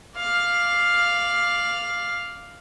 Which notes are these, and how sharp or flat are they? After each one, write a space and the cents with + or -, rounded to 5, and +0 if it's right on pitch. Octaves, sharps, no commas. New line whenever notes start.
D5 +0 F5 +0